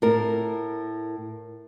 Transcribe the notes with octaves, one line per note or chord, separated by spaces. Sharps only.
A2 A#4